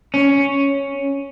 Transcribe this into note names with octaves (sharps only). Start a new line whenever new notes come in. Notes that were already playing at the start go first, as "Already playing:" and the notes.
C#4